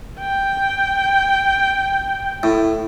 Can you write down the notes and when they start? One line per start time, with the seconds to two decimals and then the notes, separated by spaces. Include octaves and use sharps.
0.20 G5
2.43 A2